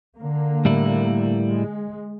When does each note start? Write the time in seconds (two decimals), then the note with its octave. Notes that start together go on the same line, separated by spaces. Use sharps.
0.18 D3 A#3
0.65 A2 G3 E4
1.47 G#3